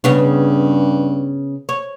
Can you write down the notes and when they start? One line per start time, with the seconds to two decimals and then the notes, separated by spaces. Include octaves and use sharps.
0.04 G2 C#3 B3 C#4
1.69 C#5